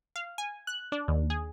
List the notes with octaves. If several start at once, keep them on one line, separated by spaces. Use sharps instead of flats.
F5
G#5
F#6
D4
D#2
G#4